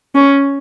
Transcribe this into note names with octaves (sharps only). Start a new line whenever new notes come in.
C#4